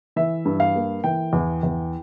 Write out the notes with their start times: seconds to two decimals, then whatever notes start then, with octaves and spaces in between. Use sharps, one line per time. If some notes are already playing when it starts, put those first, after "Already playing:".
0.16 E3 E5
0.45 G2
0.60 F5
0.75 A#3
1.04 E3 G5
1.33 E2
1.63 E2